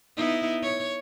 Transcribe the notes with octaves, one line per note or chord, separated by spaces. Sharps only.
B3 D#4 E4
C#5